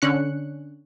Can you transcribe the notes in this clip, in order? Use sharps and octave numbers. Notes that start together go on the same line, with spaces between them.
D3 C#4 F#6 C#7